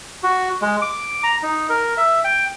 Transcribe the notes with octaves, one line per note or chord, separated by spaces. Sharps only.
F#4
G#3
D6
A#5
D#4
A#4
E5
G5